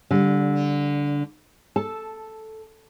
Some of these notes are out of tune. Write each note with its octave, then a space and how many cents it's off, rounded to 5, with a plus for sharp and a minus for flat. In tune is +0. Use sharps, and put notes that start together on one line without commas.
D3 -20 G3 +0
A4 +0 A5 -15